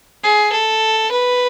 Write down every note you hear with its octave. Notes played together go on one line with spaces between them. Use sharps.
G#4
A4
B4